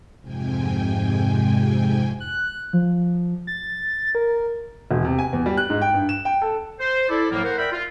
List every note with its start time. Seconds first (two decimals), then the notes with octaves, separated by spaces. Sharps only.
0.22 F2 G#2 C3 G5 G#5
2.20 F#6
2.73 F3
3.47 A6
4.15 A#4
4.91 E1
5.05 C3
5.19 G#5
5.33 E2
5.46 G3
5.57 F#6
5.70 G#2
5.82 G5
5.94 G2
6.09 E7
6.25 G5
6.42 A4
6.80 C5
7.09 E4 A4 D5
7.31 A2 F3 F#3 A#3
7.44 A#4 C5 F#5
7.58 A#4 D5 E5 G5 B5
7.72 F4